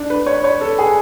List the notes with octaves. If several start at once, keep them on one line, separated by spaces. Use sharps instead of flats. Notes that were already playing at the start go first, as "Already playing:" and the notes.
Already playing: D4
B4
C#5
C#5
A4
G#4